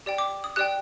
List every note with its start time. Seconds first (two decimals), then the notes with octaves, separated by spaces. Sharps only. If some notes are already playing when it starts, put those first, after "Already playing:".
0.06 G4 D5 G5
0.18 D6
0.44 D#6
0.56 G4 D5 G5 F#6